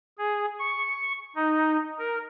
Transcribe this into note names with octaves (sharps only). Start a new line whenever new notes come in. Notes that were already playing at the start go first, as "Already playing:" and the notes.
G#4
C#6
D#4
A#4